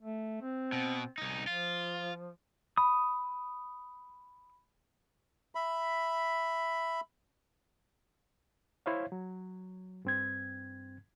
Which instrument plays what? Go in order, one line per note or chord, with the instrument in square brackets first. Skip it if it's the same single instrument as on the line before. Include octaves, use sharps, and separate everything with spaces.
[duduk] A3
C4
[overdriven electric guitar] B2
C2 D#4
[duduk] F3 [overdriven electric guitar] F4
[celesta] B5 [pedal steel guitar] D#6
[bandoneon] E5 B5
[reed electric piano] E4 C5 C#5 E5 F5
F#3
G2 C4 G#6